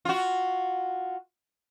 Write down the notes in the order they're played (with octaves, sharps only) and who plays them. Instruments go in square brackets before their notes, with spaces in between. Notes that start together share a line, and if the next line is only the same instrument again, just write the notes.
[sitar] F4 F#4